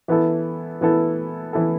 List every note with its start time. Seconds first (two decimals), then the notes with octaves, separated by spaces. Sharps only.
0.08 E3 B3 E4 A4
0.81 E3 B3 E4 A4
1.53 E3 B3 E4 A4